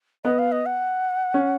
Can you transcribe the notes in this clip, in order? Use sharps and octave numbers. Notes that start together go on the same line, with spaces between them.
B3 D#5
F5
D#5
F#5
C#4